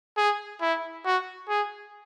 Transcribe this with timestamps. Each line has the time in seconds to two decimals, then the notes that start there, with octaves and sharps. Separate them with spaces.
0.17 G#4
0.61 E4
1.05 F#4
1.49 G#4